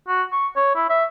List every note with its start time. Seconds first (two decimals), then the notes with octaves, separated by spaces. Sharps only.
0.08 F#4
0.32 C#6
0.56 C#5
0.76 E4
0.90 E5